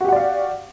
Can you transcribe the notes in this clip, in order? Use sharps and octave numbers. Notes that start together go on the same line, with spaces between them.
F#4 G4 D5 F5 F#5